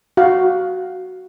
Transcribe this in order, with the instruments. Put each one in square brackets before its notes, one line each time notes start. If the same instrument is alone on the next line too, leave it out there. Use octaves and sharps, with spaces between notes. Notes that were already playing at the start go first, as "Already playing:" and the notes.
[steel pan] F#4 F5